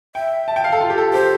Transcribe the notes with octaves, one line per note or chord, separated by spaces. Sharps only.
E5 G5
A5
G5
F5
A4
F4
G4
A4
G4 C5